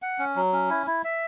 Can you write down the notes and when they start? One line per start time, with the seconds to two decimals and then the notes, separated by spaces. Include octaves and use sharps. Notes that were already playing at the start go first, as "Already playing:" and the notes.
0.02 F#5
0.19 C#4
0.36 F#3
0.53 C#4
0.70 E4
0.87 E4
1.04 E5